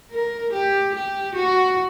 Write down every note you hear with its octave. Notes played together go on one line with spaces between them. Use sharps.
A#4
G4
G4
F#4